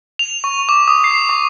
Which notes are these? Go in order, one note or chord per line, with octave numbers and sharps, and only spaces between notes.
F7
C#6
D6
D#6
C7
C#6